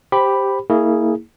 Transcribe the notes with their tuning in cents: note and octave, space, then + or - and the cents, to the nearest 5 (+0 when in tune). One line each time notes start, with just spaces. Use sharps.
G4 +0 C5 +0 B5 +0
A#3 -25 E4 -25 G#4 +0